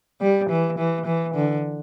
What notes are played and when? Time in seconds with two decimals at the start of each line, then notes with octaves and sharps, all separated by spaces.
0.21 G3
0.50 E3
0.79 E3
1.06 E3
1.35 D3